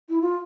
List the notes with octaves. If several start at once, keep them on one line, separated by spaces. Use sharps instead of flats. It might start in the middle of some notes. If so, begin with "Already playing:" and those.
E4
F4